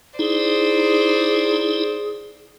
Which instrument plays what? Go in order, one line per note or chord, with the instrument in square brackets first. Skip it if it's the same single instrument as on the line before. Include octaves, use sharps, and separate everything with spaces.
[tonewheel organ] D#4 E4 [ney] G#4 [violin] C5 D5